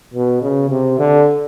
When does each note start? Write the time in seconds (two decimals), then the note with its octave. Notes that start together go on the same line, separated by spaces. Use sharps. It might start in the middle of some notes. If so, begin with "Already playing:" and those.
0.14 B2
0.42 C#3
0.70 C3
0.99 D3